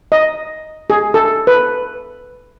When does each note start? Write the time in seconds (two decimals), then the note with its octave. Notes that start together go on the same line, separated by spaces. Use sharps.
0.12 D#5
0.90 G#4
1.14 A4
1.47 B4